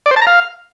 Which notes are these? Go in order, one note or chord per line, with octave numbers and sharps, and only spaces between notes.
D5
C5
A5
A#5
F5